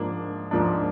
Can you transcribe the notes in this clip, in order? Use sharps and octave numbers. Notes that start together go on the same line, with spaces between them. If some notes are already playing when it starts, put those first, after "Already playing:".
Already playing: G#2 F3 A#3 D4
G#2 F3 A#3 D4